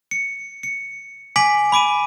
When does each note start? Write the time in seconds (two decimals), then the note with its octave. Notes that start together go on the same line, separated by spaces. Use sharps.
0.11 C#7
0.63 C#7
1.36 G#5 D6 B6 D7 F#7
1.72 B5 D6 D7 D#7